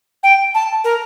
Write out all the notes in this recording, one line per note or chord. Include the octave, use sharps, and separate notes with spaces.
G5
A5
A#4